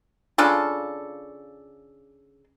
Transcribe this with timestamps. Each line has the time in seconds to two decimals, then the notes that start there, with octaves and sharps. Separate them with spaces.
0.38 C#3 D4 F4 A4